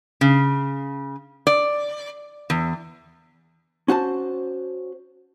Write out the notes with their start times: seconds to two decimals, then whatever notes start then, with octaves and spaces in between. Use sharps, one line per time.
0.21 C#3
1.47 D5
2.50 E2
3.88 C#4 F#4 C5 A5